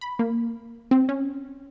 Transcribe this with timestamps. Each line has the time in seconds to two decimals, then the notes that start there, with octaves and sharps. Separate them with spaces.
0.01 B5
0.19 A#3
0.91 C4
1.09 C#4